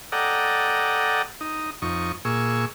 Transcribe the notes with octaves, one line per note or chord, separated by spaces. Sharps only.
A4 D5 D#5 F#5 G5 A#5
D#4
F2 D#4 C#6
A#2 G#4 C#6 E6